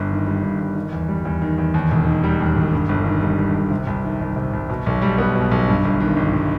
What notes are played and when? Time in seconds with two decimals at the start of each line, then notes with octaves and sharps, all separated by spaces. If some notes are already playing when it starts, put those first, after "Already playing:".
Already playing: G1 G2
0.11 D#3
0.27 G3
0.43 G2
0.60 G1
0.76 D#3
0.93 E2
1.08 G3
1.25 E2
1.42 D#3
1.58 E2
1.74 D#2
1.91 E1
2.07 D#3
2.24 G3
2.40 D#2
2.57 E1
2.73 G2
2.89 G1
3.06 D#3
3.22 G3
3.38 G2
3.55 G1
3.71 C3
3.87 C2
4.04 D#3
4.21 C2
4.36 C3
4.53 C2
4.70 B2
4.86 B1
5.02 G3
5.18 B3
5.35 B2
5.51 B1
5.68 G2
5.85 G1
6.00 D#3
6.17 G1
6.33 G2